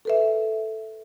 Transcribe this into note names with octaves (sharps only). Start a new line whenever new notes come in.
A4 B4 E5